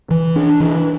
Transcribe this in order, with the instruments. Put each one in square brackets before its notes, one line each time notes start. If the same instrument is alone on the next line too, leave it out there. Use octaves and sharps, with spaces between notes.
[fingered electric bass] E3
D4
E3